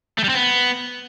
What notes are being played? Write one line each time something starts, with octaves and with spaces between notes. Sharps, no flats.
A3
G3
C4
B3